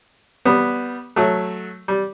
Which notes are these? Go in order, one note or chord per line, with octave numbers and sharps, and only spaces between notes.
G3 B3
F#3 A3
G3